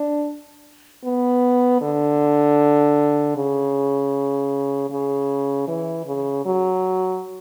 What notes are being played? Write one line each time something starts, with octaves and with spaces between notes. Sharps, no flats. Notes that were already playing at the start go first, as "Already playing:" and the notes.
Already playing: D4
B3
D3
C#3
C#3
E3
C#3
F#3